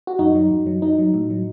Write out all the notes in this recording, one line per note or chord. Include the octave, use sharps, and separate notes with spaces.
F#4
F#2 D#4
F#3
F#2
F#3
F#3 D#4
F#3
A2
F#3